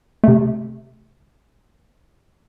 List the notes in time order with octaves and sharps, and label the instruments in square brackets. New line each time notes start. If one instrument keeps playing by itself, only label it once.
[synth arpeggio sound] C3 A3